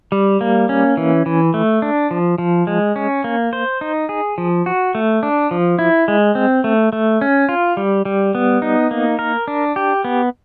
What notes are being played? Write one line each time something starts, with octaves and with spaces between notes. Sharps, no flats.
G3
A#3
C#4
E3
E3
A3
D4
F3
F3
G#3
C#4
A#3
C5
D#4
G#4
F3
F#4
A3
D4
F3
E4
G#3
C4
A3
A3
C#4
F4
G3
G3
B3
D#4
A#3
A#4
D4
G4
B3